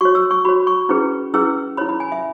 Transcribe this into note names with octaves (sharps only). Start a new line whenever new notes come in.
F#4 C#5 C#6
E6
C#6
F#4 C#5 B5
C#6
C#4 E4 G#4 B4
C#4 E4 G#4 B4 E6
E4 C#5 B5
B5
G#5
E5